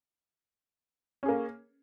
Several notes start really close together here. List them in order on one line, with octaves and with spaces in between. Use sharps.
C#4 G#4 A#3